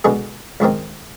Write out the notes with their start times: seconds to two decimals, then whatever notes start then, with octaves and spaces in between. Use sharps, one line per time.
0.04 B2 D3 G#3 G#4
0.60 C#2 G#2 D#3 C4